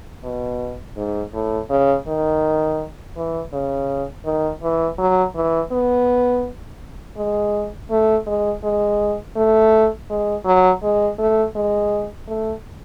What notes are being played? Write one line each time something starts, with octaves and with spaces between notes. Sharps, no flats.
B2
G#2
A2
C#3
D#3
E3
C#3
D#3
E3
F#3
E3
B3
G#3
A3
G#3
G#3
A3
G#3
F#3
G#3
A3
G#3
A3